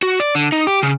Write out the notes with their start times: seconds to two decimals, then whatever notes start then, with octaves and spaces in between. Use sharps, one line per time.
0.03 F#4
0.20 D5
0.35 D3
0.52 D#4
0.67 G4
0.83 C#3